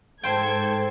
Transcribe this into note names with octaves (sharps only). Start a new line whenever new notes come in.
G#2 A4 C5 G5 G#6